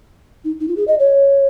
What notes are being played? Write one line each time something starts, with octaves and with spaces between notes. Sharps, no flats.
D#4
D#4
F4
G#4
D#5
C#5